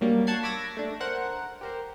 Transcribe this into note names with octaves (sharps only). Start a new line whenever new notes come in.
F#3 G3 A#3 D4
F#5 A5 C#6 F#6 G#6 C7
B5 C#6 D6 E6 G#6 A#6
A3 D4
A#4 C5 F#5
G4 A#4 C5